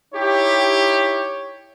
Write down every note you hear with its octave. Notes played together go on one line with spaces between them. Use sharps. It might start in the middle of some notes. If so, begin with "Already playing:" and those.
D#4 E4 G4 C#5